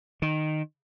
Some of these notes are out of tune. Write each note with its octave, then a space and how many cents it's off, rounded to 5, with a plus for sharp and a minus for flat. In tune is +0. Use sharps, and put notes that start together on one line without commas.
D#3 -10